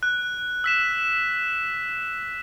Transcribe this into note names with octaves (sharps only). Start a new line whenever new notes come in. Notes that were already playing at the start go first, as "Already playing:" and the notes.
F#6
E6 B6 E7